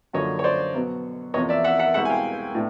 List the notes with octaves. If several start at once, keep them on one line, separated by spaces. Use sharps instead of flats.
F#2 D3 F3 A#3 C#5 D#5
C#5
C5 D5
B2 F#3 B3
E2 C3 F3 A#3 C#5 D#5
D5 E5
E5 F#5
E5 F#5
C2 B2 G#3 E5 F#5
G#5
F5 G5
A2 B3 D4